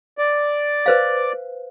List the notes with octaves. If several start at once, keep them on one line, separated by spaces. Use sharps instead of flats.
D5
B4 C5 F5